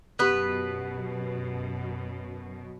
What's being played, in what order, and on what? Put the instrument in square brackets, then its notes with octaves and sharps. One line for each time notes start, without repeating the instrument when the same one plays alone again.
[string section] F#2 B2 [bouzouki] B3 B4 [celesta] G4 F#6